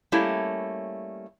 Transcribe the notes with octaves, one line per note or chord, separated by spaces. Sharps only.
G3 A3 A#3 C#4 E4 G4